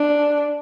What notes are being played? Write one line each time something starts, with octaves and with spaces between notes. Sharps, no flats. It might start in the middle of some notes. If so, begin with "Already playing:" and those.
Already playing: D4